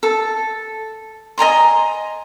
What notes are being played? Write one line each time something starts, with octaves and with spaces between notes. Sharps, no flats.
A4
D#5 G#5 A#5 C6